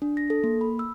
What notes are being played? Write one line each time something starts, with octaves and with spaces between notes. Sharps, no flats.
D4
A#6
A4
A#3
B5
E6